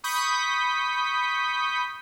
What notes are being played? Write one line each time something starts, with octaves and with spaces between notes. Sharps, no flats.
B5 C#6 D#6 G6 B6